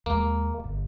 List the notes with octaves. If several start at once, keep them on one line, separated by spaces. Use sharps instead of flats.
D#2 G#3 A#3
D1 G1